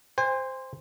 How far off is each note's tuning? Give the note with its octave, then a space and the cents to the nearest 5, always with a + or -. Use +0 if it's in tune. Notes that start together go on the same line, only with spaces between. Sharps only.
C5 -5 G#5 -45